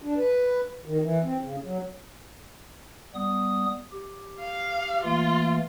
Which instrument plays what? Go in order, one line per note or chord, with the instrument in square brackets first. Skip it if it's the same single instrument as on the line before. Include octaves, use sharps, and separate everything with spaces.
[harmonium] D4
B4
D#3
E3
C4
C#3
F#3
[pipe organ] G3 B3 D#6
G4
[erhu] F5
[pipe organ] E3 A3 A#3 [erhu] F4